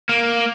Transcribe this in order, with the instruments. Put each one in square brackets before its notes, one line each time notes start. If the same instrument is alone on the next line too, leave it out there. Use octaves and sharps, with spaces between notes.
[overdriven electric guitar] A#3